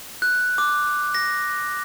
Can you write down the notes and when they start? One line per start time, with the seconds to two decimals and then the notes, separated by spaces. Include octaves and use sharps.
0.22 F#6
0.58 D6
1.15 A#6